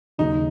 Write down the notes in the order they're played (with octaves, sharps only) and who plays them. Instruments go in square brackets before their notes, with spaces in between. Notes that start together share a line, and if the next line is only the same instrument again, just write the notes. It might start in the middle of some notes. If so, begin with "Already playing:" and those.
[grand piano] D#2 C#3 F#3 [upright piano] D#4